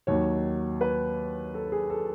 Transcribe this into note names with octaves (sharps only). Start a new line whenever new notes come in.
D#2 D#3 F#3 C#5
B4
A4
G#4
A4